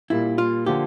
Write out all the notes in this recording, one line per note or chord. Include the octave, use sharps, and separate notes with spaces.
A#2 G3 A#3 E4
F4
D3 F3 A#3 F4 G4